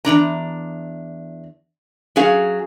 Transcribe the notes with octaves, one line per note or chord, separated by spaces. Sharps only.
E2 C3 D4 A#5
F#3 C#4 G#4 F5